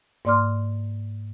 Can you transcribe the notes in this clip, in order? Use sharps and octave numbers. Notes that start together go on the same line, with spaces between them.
G#2 A#3 D5 C6 D6 F6